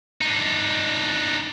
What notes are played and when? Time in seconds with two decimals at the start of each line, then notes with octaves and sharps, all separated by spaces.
0.21 D4 D#4